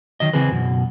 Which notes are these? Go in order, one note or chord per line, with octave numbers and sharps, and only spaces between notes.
D#3 F#3 D#5
C#3 E3 C4 G#4 B4
F#2 B2